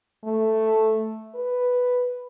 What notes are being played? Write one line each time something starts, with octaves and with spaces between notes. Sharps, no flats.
A3
B4